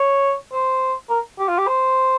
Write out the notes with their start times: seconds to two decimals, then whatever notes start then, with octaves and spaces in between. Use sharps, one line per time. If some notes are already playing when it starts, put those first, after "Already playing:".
Already playing: C#5
0.52 C5
1.09 A#4
1.39 G4
1.48 F4
1.58 G4
1.67 C5